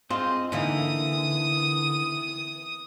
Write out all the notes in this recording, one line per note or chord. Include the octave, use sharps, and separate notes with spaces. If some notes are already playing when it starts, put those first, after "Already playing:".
C4 F4 G#4 C5 D#5
D3 E3 A#3 D#4 D#6